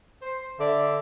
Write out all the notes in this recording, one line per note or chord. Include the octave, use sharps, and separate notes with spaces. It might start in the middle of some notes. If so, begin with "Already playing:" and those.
C5
D3 D5 E5